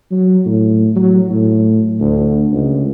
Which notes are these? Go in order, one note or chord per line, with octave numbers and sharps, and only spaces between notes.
F#3
A2
F#3
A2
D2
C#2